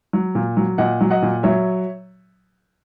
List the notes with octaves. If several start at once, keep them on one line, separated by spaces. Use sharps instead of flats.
F#3
A#2
F#3
A#2 D#5 F#5
F#3
D#5 F#5
A#2
F#3 C#5 E5